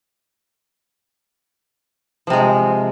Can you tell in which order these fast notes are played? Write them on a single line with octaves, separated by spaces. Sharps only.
F3 C3 G#3